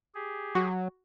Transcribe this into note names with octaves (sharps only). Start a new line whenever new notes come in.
G4 G#4
F#3 F#4